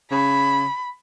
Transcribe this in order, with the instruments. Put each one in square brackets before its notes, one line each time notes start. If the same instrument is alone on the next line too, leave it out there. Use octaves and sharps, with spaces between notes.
[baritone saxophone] C#3 [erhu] B5